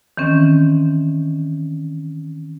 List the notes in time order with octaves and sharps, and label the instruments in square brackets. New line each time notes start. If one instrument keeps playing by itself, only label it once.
[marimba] D#3 E3 C4 C#4